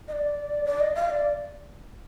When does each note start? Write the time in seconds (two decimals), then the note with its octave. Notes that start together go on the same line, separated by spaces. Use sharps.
0.08 D#5
0.13 D5
0.65 D5
0.80 D#5
0.95 F5
1.10 D5